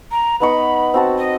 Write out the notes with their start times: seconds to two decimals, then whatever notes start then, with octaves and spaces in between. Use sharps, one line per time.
0.11 A#5
0.40 B3 D#4 B5 C#6
0.94 C4 F#4 A5
1.18 D#5